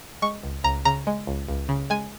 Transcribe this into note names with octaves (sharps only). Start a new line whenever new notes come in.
G#3 C#6
C#2
C#2 A#5
C#3 A#5
G#3
C#2
C#2
C#3
G#3 G#5